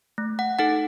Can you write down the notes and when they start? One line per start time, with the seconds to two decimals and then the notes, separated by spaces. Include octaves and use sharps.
0.18 A3
0.39 F#5
0.59 D#4 A4 F#5